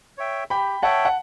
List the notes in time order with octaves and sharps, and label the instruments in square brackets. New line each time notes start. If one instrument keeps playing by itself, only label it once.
[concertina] C#5 E5 G5
[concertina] G4 [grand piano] G5 B5
[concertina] C#5 E5 G5 [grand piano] F#5 A5
[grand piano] F#5